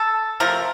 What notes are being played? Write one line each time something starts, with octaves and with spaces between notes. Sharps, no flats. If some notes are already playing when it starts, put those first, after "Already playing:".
Already playing: A4
C3 F3 A3 A#4